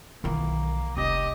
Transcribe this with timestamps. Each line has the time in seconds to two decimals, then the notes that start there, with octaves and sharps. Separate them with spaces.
0.24 B1 D#3 E3 A#3
0.97 F1 C2 G4 D#5